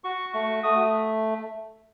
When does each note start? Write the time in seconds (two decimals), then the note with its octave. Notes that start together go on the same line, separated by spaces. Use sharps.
0.04 F#4 C#6
0.33 A3 C#6
0.63 A3 D#6